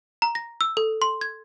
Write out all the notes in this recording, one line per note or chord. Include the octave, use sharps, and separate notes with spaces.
A#5
A#6
E6
A4
C6
G#6